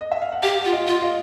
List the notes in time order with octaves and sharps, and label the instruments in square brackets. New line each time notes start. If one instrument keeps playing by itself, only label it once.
[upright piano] D#5
E5
F5
F#5
[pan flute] G4 [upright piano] F5 G5
[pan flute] F4 [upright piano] F#5
[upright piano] D#5 F5
[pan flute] F4
[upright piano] D#5 F5